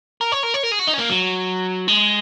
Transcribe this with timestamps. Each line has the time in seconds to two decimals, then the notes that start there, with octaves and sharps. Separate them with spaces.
0.21 A#4
0.32 C#5
0.43 A#4
0.54 C#5
0.63 A#4
0.72 G#4
0.79 F#4
0.88 D#4
0.94 C#4
0.99 A#3
1.10 F#3
1.88 G#3